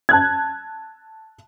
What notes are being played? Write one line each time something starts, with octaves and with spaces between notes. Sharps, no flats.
A5 F#6 G#6